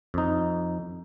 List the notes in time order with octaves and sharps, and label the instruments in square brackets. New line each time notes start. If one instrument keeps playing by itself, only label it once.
[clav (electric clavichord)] F2 D#4